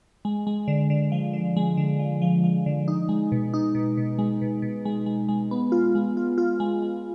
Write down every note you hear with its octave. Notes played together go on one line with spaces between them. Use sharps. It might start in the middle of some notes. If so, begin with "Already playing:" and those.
G#3
G#3
D3
D3
F3
D3
G#3
D3
F3
F3
F3
D3
D#4
G#3
B2
D#4
B2
B2
G#3
B2
B2
G#3
G#3
G#3
B3
F4
G#3
F4
F4
G#3
G#3